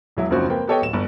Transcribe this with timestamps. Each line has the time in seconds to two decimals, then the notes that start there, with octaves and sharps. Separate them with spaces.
0.17 E1 F#3 E4
0.30 F#1 D#2 C#3 F3 C4 F#4
0.50 A#3 C4 B4 G5
0.67 B3 G4 A4 C#5 D#5 G5
0.82 D1 E7
0.93 G1